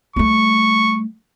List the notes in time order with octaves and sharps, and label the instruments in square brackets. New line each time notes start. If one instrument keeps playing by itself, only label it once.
[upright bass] G3 A3 [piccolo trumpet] C#6